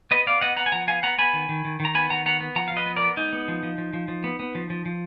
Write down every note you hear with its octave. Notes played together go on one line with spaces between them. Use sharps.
B3 B4 D#5
B3 D5 F5
B3 D#5 F#5
B3 F#5 A#5
G#5
F3 F#5 A#5
B3 F5 G#5
B3 F#5 A#5
B3 G#5 B5
D#3
D#3
D#3
D#3
A#5
B3 G#5 B5
D#3 F#5 A#5
B3 F#5 A#5
B3
F3 F#5 A#5
F5
F3
B4 D#5
B3
A#4 D5
B3
G#3 D#4
B3
F3
F3
F3
F3
F3
B3
B3
F3
F3
F3